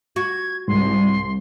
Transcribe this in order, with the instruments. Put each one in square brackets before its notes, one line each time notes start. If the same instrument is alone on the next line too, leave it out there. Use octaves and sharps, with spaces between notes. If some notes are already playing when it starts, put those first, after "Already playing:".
[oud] F#4 [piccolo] G#6
[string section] C2 [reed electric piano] G#2 [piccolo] C6